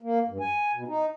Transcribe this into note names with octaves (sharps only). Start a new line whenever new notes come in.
A#3
G2
G#5
B2
D#4